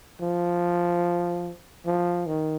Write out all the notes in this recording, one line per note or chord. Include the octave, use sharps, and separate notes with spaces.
F3
F3
D#3